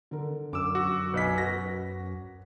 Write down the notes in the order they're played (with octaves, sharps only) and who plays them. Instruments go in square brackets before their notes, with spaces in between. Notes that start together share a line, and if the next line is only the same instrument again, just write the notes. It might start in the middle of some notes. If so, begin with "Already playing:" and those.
[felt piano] D3 A#4
[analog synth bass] F#2 [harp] D6 E6
[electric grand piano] F#4
[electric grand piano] B1 B6 [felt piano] B4 D#5 G#5
[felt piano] F#4 B4 [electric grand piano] A#6